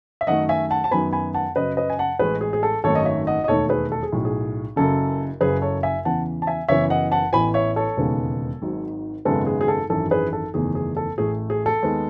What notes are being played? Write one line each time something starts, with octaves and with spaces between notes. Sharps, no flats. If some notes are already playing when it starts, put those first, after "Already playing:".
E5
F#2 D#3 A3 D#5 F#5
E5 G#5
F#5 A5
A5
F#2 D#3 F#3 B3 G#5 B5
G#5 B5
F#5 A5
F#2 C#3 F#3 B4 D#5
B4 D#5
G#5
F#5 A5
A1 A2 E3 G#3 G#4 B4
G#4
G#4
A4
G#1 F#2 D#3 A3 A4 C#5
D#5
C#5 E5
D#5 F#5
D#5
E1 D#2 D#3 A3 A4 C#5
G#4 B4
A4
G#4
B1 A2 F#3
G#4
F#1 F#2 C#3 A4
F#1 F#2 C#3 G#4 B4
A4 C#5
E5 G#5
E2 C#3 E3 F#5 A5
A5
E5 G#5
F#1 F#2 C#3 E3 B3 C#5 E5
D#5 F#5
F#5 A5
A1 A2 E3 B3 G#5 B5
C#5 E5
A4 C#5
E1 D#2 C#3 G#3 B3
G#1 G#2 D#3 F#3
G#1 F#2 C#3 G#3 B3 A4
G#4
G#4
A4
G#1 F#2 E3 A4
G#4 B4
A4
F#1 E2 D#3 A3 G#4
G#4
A4
A1 A2 E3 A3 G#4
G#4
A4
D#2 D#3 G#3 B3